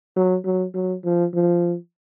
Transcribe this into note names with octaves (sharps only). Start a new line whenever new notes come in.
F#3
F#3
F#3
F3
F3